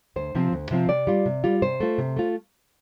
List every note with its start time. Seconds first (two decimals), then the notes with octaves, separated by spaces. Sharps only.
0.16 D2 C5
0.35 C3 F3 C4 F4
0.53 D2
0.71 C3 F3 C4 F4
0.89 C3 D5
1.07 G3 F4
1.26 C3
1.44 G3 F4
1.62 C3 C5
1.80 A3 F4
1.98 C3
2.17 A3 F4